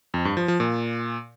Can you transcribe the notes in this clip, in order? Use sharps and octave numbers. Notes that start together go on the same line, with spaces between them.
F2
G2
F3
F3
A#2